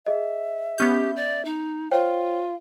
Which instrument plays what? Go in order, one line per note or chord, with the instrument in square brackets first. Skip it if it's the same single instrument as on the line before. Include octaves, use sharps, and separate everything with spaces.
[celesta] G#4 D#5 [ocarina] E5
[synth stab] B3 C#4 G6 [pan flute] G4
[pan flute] D5
D#4
[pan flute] F4 [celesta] C5 C#5 G5 [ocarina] F5